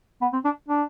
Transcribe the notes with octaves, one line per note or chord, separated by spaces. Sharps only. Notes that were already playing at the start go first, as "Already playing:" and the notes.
B3
C4
D4
D4